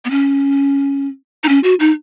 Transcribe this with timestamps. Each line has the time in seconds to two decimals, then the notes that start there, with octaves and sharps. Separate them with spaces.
0.05 B3
0.11 C#4
1.44 D#4
1.49 C#4
1.64 F#4
1.80 D#4